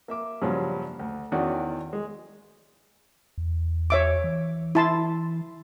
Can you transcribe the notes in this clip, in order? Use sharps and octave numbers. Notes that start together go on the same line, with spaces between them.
A#3 E5 D6
G2 A#2 C#3 F3 F#3
D2
E2 D#3 C#4 F#4 D5 F#5
G#3
E2
C#5 E5 D6
E3
E4 A5 C6